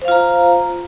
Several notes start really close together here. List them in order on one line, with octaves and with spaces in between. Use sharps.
C5 F5 F4 A#5